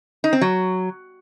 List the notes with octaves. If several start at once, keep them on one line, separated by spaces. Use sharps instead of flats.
D#4
C4
F#3